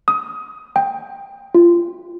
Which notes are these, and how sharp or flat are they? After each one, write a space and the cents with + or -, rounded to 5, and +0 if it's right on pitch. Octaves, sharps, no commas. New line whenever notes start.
D#6 +20
G5 +15
F4 -20